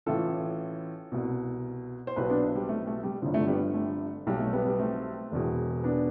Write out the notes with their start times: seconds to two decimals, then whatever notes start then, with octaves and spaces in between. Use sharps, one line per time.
0.06 A1 A2 E3 F4 A4
1.12 C2 B2
2.07 C5
2.16 B1 B2 G4 B4
2.30 B3 D4
2.55 G3
2.69 A3
2.87 A3
3.03 G3
3.22 G1 G2 D3 F3
3.34 A3
3.47 G3 B3
3.74 A3
4.26 B1 B2 G3
4.40 A3
4.53 G3 B3
4.65 G3 B3
4.79 A3 C4
5.31 E1 E2 B2
5.83 B3 D4